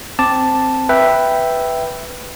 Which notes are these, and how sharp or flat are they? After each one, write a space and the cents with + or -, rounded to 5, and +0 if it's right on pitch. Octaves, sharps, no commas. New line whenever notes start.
C4 +0 A5 +0 D6 +0
B4 +0 E5 +0 G5 +0